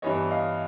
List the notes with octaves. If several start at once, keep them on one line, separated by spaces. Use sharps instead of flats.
G2 E3 G3 B3 C#5 D#5
D#5 F5